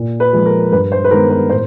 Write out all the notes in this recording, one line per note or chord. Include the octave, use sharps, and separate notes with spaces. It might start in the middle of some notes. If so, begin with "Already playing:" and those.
Already playing: A#2
B4
F3 G#3
A#4
G2 B4
C5
B4
D#3 G#3 B3 A#4
B4
A2 C5